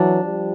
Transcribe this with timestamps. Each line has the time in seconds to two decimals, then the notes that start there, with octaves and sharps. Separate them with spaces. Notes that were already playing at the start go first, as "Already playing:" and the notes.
Already playing: E3 F#3 D4
0.22 F3 G3